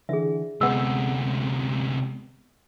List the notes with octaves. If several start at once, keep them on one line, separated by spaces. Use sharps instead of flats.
D3 E3 G#4 E5
D2 C3 G#3 B3 F#5 E6